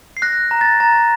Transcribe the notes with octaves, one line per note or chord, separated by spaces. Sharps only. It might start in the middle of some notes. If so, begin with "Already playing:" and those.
C7
F#6 A#6
A#5
A6
A#5 A6